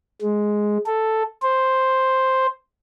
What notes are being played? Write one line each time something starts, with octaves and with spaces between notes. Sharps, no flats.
G#3
A4
C5